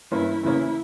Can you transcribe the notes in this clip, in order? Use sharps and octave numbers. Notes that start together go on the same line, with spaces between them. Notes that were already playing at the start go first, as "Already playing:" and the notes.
G2 E3 A#3 C#4 E4
E2 C#3 E3 A#3 C#4 E4